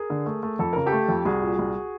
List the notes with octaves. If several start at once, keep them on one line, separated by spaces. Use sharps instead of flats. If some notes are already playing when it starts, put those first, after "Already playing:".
Already playing: G#4 A#4
D3
A3
A3
F2 A4
C#3 A#4
G4 A4
A3
F2
C2 F#4 G#4
A#2
C2